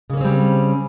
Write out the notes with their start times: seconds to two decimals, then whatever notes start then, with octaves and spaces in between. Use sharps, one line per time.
0.10 C#3
0.13 A#3
0.17 C#4
0.21 C4
0.24 G3